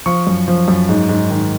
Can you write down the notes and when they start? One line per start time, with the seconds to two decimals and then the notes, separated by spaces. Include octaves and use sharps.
0.06 F3 C#6
0.27 F#2
0.48 F3
0.68 F#2
0.89 G#2
1.09 G#2
1.31 D#3